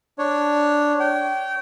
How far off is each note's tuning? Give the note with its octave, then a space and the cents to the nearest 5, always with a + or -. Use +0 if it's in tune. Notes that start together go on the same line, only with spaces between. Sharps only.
D4 +0 C#5 +0
C#5 +0 G5 -30